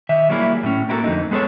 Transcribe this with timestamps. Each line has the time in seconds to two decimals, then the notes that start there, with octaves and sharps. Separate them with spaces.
0.09 D#3 E5
0.30 F#3 G3 A#3 E4 G#4
0.63 A2 C#4
0.89 A#3 E4 F#4 G4 A4 A#4
1.04 F2 D3 A3 D#4
1.31 G#3 B3 G#4 A4 C#5